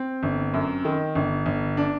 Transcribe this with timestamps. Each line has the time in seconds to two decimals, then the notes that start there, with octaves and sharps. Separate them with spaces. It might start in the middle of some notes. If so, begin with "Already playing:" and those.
Already playing: C4
0.23 G1
0.54 F#2
0.85 D#3
1.15 G1
1.46 G1
1.77 D4